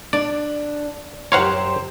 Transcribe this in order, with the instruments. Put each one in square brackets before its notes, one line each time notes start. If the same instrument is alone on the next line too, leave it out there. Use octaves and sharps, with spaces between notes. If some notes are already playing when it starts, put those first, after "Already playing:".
[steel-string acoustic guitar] D4 [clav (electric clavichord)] D5
[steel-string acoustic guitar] F#2 A#5 [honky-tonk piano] G4 C5 C6 [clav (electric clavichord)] C#5 F5 F#5